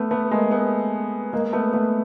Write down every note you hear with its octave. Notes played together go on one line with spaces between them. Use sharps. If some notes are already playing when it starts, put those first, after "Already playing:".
Already playing: A3 B3
A3 B3
G#3 A#3
A3 B3
G#3 A#3
A3 B3
A3 B3